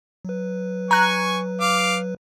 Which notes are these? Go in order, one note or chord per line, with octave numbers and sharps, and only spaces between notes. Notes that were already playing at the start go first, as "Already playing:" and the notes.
F#3 B4
G#5 A#5 C#6 F#6
F5 D6